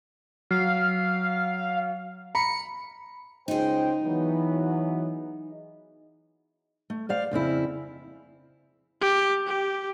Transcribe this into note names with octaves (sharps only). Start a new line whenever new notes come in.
F#3 F5
A#5 B5 C#7
C#2 D#4 G#4 C5 G5
E3 F#3 B3
A3
C5 D5 F5
F2 C#3 C4 E4
G4
G4